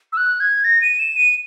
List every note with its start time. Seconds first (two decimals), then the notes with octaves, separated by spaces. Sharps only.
0.13 E6
0.17 F#6
0.40 G#6
0.64 A#6
0.82 D#7
0.99 E7
1.16 D#7